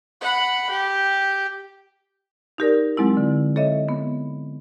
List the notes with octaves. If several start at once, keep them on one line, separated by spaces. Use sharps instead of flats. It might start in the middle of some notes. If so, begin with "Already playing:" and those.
F#5 B5
G4
D#4 G4 A#4 D5
F#3 G#3 C4 E4
D3
A4 C#5 D#5 E5
B3